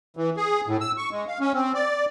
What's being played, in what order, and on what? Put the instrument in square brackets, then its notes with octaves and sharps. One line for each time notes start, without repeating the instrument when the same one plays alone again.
[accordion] E3
G#4
A2
E6
C#6
G#3
F5
C#4
C4
D5